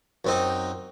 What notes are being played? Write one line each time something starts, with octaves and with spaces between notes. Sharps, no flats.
F#2 C4 D#4